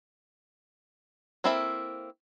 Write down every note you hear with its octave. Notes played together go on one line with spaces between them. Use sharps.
A#3 C4 E4 A4 E5